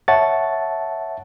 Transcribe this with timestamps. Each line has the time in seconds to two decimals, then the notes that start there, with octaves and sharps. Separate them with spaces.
0.08 C#5 E5 F#5 A5 A6